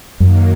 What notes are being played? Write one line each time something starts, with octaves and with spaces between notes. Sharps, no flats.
F#2 D#3 F#3 A#3